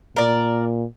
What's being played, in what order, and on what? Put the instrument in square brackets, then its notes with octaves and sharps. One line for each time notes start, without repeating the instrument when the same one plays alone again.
[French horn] A#2 [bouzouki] A#4 D5